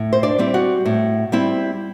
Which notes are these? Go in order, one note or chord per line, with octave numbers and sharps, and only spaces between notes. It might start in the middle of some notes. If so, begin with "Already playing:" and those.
Already playing: A2
C5
D4 D5
G3 C4 E4
F#4 F#5
A2
G3 C4 E4